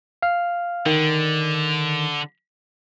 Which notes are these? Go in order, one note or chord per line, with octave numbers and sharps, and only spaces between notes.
F5 F6
D3 D#3